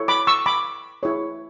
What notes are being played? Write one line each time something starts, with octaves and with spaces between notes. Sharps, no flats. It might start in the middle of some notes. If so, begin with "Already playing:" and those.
Already playing: E4 A4 C#5
B5 D6
C#6 E6
B5 D6
E4 G#4 C#5